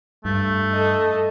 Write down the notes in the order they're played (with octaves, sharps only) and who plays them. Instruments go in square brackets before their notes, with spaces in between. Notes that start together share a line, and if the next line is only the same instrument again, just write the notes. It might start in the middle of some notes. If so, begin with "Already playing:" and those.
[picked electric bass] G2 [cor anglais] A3
[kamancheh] A4 D#5